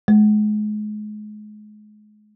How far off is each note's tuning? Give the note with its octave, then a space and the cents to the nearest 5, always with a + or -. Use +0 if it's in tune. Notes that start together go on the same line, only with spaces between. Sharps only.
G#3 +30